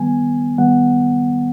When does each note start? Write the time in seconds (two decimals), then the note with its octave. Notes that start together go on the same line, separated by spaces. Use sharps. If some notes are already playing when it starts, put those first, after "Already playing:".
Already playing: D#3 G3 B3 G#5
0.58 D#3 G3 B3 F#5